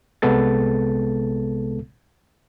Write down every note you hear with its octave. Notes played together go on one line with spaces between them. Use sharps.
C2 C3 G#3 B3 A4 A6